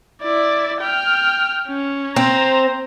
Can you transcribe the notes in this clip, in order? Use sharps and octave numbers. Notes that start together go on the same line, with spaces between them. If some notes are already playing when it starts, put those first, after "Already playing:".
E4 D5
G5 F6
C#4
C4 C5 A#5